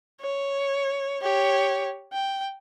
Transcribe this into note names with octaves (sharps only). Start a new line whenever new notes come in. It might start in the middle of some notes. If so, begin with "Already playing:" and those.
C#5
G4 C#5
G5